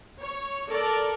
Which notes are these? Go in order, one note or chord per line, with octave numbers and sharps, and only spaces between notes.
C#5
A4 A#4 D5